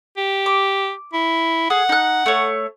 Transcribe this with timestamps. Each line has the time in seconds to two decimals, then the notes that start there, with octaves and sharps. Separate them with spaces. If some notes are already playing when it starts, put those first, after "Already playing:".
0.17 G4
0.46 D6
1.13 E4
1.70 G#4 F#5
1.89 D#4 F#6
2.26 A3 C#5